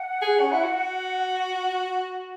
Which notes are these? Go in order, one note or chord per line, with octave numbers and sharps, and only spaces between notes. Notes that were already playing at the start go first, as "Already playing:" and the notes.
Already playing: F#5
G#4
C#4
E4
F#4